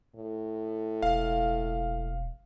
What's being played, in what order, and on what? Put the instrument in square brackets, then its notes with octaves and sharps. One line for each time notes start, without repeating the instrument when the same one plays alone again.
[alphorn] A2
[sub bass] E1 [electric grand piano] F5